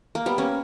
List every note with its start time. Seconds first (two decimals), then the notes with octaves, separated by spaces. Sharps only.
0.15 A#3
0.26 G3 B3
0.38 A#3 C#4